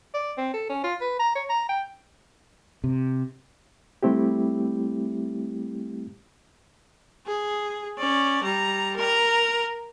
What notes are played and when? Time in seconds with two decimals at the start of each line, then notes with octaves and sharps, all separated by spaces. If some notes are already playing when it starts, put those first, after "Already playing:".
0.14 D5
0.38 C4
0.54 A4
0.69 C#4
0.84 F4
1.01 B4
1.19 A#5
1.35 C#5
1.50 A#5
1.69 G5
2.84 C3
4.03 G3 A3 C4 E4 G4
7.26 G#4
7.98 C#4 D5
8.43 G3 A#5
8.96 A#4 A#5